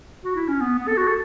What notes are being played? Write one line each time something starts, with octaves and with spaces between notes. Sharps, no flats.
F#4
E4
C#4
B3
B3
A4
F#4
A4